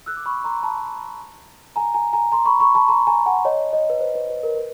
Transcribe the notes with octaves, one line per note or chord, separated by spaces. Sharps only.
E6 F#6
D6
B5 C#6
A#5 C6
A5 B5
G#5 A#5
G#5 A#5
G#5 A#5
A#5 C6
B5 C#6
B5 C#6
A5 B5
A#5 C6
G#5 A#5
F#5 G#5
C#5 D#5
C#5 D#5
B4
C5
B4
B4
A#4
B4